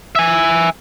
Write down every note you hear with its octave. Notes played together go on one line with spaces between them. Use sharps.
E5 G#5